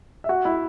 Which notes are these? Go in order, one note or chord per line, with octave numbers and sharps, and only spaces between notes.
E5
F#4 F#5
E4 E5